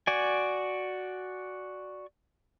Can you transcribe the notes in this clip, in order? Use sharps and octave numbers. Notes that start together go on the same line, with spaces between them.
F#4 D5 G#5